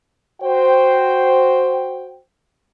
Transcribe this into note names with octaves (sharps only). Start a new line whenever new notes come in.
F#4 C5 G5